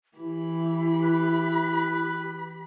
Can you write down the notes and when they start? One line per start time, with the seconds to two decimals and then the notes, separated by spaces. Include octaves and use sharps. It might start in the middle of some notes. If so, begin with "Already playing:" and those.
0.17 E3 E4 G4 B5
1.04 B4